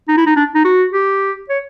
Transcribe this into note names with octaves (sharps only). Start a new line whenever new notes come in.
D#4
E4
D#4
D4
D#4
F#4
G4
C#5